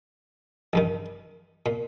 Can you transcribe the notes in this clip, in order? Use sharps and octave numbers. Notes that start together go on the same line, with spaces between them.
A1 G2 D#3
A#2